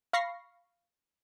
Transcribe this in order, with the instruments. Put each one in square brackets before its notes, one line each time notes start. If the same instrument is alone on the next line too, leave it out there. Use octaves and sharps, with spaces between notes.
[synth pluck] F5 B5 C#6 A#6 C7